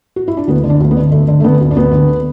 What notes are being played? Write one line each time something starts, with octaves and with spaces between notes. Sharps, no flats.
F#4
E4
D4
D2 B3
D3
D4
D2
B3
D3
D3 A3
D3
A3
D3 B3
D2
D4
D2 B3
D3